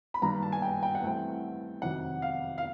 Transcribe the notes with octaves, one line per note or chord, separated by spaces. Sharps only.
B5
G2 D#3 G3 A#3 A#5
A5
G#5
G5
G5
F#5
G2 E3 A3 C4 G5
F2 C3 D#3 F#3 F#5
F5
F5